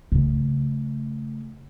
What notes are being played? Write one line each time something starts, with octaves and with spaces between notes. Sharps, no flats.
C#3 A3